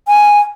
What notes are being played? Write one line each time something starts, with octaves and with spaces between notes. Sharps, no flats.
G#5